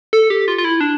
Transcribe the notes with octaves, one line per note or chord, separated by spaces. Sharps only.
A4
G4
F4
F4
E4
D4